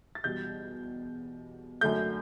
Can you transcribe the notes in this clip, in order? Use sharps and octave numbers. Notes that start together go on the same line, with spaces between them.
A6
E2 B2 G3 G6
F#2 D3 A3 G6